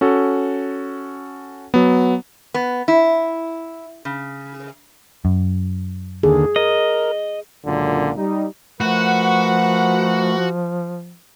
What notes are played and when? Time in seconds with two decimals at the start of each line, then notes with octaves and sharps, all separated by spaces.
0.01 C#4 F#4 A4
1.74 F#3 B3
2.54 B3
2.88 E4
4.05 C#3
5.25 F#2
6.23 D#2 D3 G#4
6.56 A#4 D#5
7.64 C#2 F#2 A#2 D3
8.15 G3 D#4
8.81 F3 A3 F#4 A#4 B4 F#5